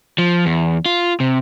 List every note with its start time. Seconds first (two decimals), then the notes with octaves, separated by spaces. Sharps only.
0.18 F3
0.46 E2
0.86 F4
1.20 C3